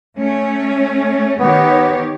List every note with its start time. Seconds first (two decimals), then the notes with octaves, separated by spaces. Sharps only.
0.19 A3 C#4
1.40 D#3 B3 G4 C#5